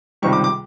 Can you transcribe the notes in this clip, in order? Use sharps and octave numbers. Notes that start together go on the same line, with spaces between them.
C#2 C3 D#3 G3 C#6
D6
D6